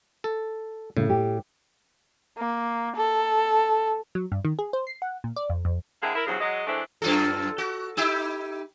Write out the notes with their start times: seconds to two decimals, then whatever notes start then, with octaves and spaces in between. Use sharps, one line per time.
0.24 A4
0.97 A2 C#3
1.09 G4
2.37 A#3
2.96 A4
4.15 F#3
4.32 G2
4.45 D#3
4.59 G#4
4.73 C5
4.87 C7
5.02 F#5
5.24 A#2
5.36 D5
5.50 F2
5.65 F2
6.02 D3 A#3 C4 E4 G#4
6.15 E4 A#4
6.27 E2 G2 C#3 F3 F#3
6.40 F#3 G#3 D#5
6.67 E3 G#3 A3 C4 D4 E4
7.02 F#2 F4 A4
7.58 F#4
7.97 D#4 E4 G4